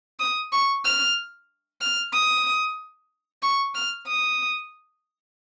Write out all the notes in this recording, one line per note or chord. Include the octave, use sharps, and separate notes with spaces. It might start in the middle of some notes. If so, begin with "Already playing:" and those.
D#6
C#6
F6
F6
D#6
C#6
F6
D#6